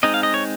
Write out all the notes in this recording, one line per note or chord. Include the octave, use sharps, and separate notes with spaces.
G#3 C4 D#4 D#5
F5
D#5
C#5